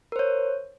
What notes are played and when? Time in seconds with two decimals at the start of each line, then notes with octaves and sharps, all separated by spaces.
0.12 A#4
0.16 C5
0.19 C#5